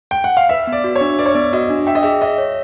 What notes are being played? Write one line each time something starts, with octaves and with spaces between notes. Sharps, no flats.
G5
F#5
F5
B4 E5
B3
D5
F#4
C#5
D4
B4 D5
C#5
B3 D5
F#4 D#5
D4
E5 G5
D#5
G#4 E5
D#5 E5
C#5